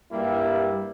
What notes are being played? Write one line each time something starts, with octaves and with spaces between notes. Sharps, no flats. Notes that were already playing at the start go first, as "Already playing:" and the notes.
G2 G3 A#3 E4